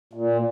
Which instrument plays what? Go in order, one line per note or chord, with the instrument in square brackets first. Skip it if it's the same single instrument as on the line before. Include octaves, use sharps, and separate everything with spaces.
[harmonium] A#2